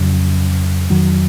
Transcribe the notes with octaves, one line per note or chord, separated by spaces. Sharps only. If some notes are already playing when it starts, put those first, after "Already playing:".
Already playing: F2 C#3 F#3 C#4
F2 D#3 F#3